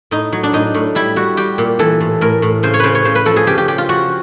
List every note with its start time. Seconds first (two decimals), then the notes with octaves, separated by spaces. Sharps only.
0.11 A2 D#4
0.33 F#3
0.43 D4
0.53 A2 D#4
0.75 A2
0.95 G3 E4
1.16 G3 F#4
1.37 G3 G4
1.58 A#2
1.79 E3 A4
2.01 A2
2.21 A2 A#4
2.42 A2
2.63 C#3 C5
2.74 C#5
2.80 C#3 B4 C5
2.95 C#5
3.05 C#3 C5
3.15 B4
3.26 F3 A4
3.36 G#4
3.47 C#3 G4
3.58 G4
3.68 F3 G4
3.78 F4
3.89 F3 F#4